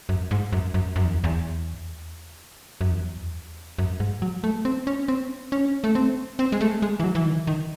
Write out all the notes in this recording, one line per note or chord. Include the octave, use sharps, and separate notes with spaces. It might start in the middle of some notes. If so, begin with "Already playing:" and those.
F#2
G#2
F#2
F#2
F#2
E2
E2
F#2
E2
F#2
G#2
F#3
A3
C4
C#4
C4
C#4
A3
C4
C4
G#3
A3
G#3
E3
F#3
E3
D#3
D#3